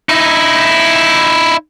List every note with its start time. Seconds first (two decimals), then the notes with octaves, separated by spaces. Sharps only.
0.09 D#4 E4